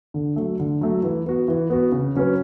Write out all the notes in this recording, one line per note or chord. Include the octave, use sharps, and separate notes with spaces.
D3
F#3 A3
D3
F#3 A3
E3
B3 F#4
E3
B3 F#4
C#3
F#3 C#4 F#4 B4